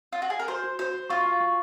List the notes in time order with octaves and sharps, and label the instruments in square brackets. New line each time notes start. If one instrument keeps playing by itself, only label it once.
[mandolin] F4
F#4
G#4
A#4
[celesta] F#4 [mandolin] C5
[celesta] F#4
[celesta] F#4 [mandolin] C5
[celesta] F#4
[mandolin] F4 [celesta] C#6
[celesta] C#6
C#6